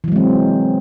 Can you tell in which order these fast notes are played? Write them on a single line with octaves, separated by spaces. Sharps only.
E3 F#3 G#3 C4